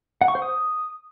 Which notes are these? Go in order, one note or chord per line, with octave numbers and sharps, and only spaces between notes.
F#5
C#6
C5
D#6